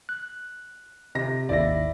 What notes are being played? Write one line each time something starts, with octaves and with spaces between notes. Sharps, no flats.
F#6
C3 A#6
G#1 D#2 E4 D5 A#6